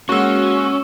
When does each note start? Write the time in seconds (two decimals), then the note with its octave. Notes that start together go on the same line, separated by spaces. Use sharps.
0.09 G#3 A#3 C#4 F#4 C#6 E6